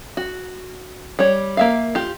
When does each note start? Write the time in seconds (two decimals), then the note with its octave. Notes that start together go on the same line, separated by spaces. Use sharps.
0.17 F#4
1.19 G3 C#5
1.57 A#3 E5 F5
1.95 F4 G4